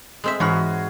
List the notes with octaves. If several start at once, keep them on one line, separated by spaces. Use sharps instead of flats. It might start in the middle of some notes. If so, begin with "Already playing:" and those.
G#3 C4 E5
G#2 E3 F#4 G#4 C#5 B5 F6